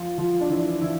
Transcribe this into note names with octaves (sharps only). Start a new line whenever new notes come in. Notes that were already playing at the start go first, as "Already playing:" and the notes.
Already playing: F3 F4
F3 F4
D4
E3 E4
E3 E4